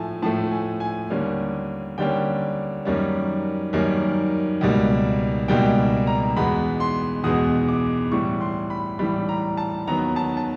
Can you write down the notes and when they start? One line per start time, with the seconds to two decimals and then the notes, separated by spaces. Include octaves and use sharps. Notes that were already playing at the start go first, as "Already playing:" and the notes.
Already playing: A2 F3 A3 G#5 A5
0.22 A2 F3 A3 A5
0.51 G#5
0.80 G#5
1.10 D#2 D3 G3 A#3 C#4
1.98 D#2 D3 G3 A#3 C#4 G5
2.85 F#2 D#3 G3 A#3 C#4
3.73 F#2 D#3 G3 A#3 C#4
4.61 C#2 B2 G3 A#3
5.48 C#2 B2 G3 A#3 G5
6.07 A#5
6.36 E2 B2 G#3 B3 B5
6.80 C6
7.24 E2 B2 G#3 B3 D#6
7.68 D6
8.12 A2 E3 G3 C#6
8.41 C6
8.70 B5
8.99 A2 E3 G3 B5
9.29 A#5
9.57 A5
9.87 D#2 D#3 F#3 B3 A#5
10.16 A5
10.37 A5